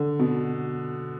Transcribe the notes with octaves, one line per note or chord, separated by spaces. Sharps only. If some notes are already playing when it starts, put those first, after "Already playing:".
Already playing: D3
B2